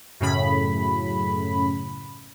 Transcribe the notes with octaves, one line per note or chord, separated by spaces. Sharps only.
F#2 A2 C#3 B5